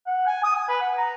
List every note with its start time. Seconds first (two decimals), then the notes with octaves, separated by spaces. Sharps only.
0.07 F#5
0.27 G#5
0.44 D#6
0.56 G#5
0.69 B4
0.81 F#5
0.97 A#5